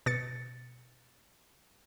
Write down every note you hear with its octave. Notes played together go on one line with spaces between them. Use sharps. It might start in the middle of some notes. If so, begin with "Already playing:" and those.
B2 A6 C#7